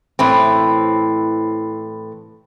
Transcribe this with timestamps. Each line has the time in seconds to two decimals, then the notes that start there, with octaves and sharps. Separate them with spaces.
0.19 A2 E3 C4